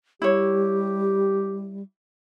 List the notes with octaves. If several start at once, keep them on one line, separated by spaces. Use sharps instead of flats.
G3 E4 G4 C#5